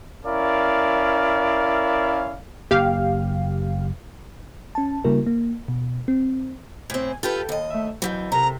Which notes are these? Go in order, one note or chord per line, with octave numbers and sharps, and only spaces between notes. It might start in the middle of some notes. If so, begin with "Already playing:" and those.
C#4 E4 A#4 D5 F5
F#1 A#3 G4 F5
C#4 A5
C#3 G3 A#3 E4 F#4 A#4
A#3
B2
C4
A2 C4 G#5
F4 G4 A4 B4 G5
D#2 D#5
A3 E5
F2 G#2 E3 F#3 G6
C3 C4 A4 A#4 A#5